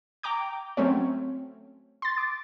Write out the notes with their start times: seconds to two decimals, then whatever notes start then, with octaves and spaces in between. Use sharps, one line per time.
0.23 G5 A#5 D6 G6
0.77 F#3 A3 C4 C#4 C#5
2.02 C6 A6
2.17 D6